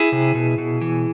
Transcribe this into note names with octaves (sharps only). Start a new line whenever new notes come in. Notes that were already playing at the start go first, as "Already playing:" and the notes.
Already playing: E4 G#4
C3
B2
B2
E3